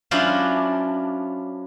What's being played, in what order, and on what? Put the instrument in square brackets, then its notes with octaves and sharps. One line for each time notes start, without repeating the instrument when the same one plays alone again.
[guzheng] F#3 C#4 D4 E4 F4 C5